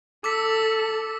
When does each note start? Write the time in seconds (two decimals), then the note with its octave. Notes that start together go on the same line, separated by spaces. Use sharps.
0.24 A4 D6 E6 B6